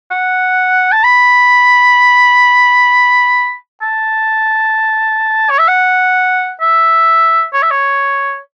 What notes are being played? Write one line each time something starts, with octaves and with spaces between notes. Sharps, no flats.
F#5
A5
B5
A5
C#5
E5
F#5
E5
C#5
E5
C#5